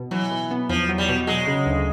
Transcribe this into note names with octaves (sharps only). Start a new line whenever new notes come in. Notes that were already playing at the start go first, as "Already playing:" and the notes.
Already playing: B2
E3 F#3
B2
B3
E2 F3
F#3
G3
B2
F#3 G#3
C#3
D2